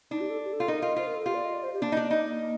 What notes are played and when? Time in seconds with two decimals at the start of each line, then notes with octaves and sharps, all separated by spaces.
0.11 D4 D#4
0.21 G4
0.30 A4
0.44 G4
0.53 A4
0.60 F4
0.68 D#4 A#4
0.82 F4
0.96 F4 C5
1.07 A#4
1.15 A4
1.26 F4 G4
1.34 D5
1.45 D#5
1.53 D5
1.63 C5
1.73 G4
1.82 A#3 D4
1.92 D#4
1.97 D4
2.11 D#4